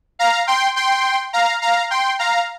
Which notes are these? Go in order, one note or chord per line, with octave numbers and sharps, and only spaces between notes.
F5 A#5
G5 C6
G5 C6
F5 A#5
F5 A#5
G5 C6
F5 A#5